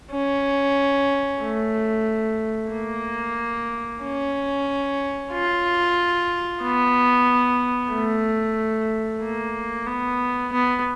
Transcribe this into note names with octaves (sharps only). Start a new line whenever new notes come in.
C#4
A3
A#3
C#4
F4
B3
A3
A#3
B3
B3